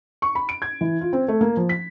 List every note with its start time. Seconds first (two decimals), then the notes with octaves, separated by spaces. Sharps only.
0.22 C#6
0.35 B5
0.49 D7
0.62 G#6
0.81 E3
1.01 F4
1.13 C4
1.28 A3
1.41 A#3
1.57 F3
1.69 B6